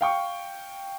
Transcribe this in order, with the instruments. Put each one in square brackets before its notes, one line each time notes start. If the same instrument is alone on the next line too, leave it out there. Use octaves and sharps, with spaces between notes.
[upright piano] F5 G5 C#6